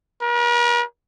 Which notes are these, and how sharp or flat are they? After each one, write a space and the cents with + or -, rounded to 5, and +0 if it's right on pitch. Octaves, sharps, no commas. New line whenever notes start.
A#4 +45